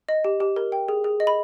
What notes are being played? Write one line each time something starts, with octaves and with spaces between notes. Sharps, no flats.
D#5
G4
G4
A#4
G5
G#4
G#4
D#5
B5